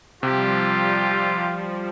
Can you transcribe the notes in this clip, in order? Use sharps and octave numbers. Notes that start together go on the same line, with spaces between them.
C3 F3 G3 F4 G4